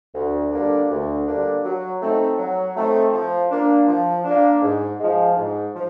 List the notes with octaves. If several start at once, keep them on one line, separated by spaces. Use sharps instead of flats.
D2
D3 G3 A#3 D4
D2
D3 G3 A#3 D4
F#3
A3 C4 D#4
F#3
A3 C4 D#4
F3
A#3 D4
F3
A#3 D4
G#2
F3 G#3
G#2
F3